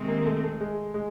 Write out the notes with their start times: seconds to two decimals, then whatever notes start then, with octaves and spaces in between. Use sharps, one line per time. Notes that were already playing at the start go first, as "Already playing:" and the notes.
Already playing: C3 D#3 G#3 C4
0.08 A#3
0.26 A3
0.43 A3
0.61 G#3
0.94 G#3